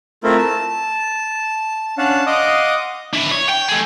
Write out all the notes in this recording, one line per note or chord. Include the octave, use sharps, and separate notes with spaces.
A3 C4 E4 F4 A#4
A5
C#4 D4 F5 F#5 A5
D#5 F5 F#5 C6 D6 D#6
D4 E4
C#5
G5
A3 G#4